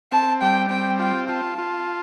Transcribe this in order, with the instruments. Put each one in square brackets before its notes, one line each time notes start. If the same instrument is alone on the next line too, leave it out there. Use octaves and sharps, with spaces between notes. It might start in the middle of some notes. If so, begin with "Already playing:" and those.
[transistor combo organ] C4 [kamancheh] A5
[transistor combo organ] G3 [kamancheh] G5
[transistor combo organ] C4 [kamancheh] G5
[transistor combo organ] F4 [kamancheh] G5
[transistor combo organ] F4 [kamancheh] A5
[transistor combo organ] F4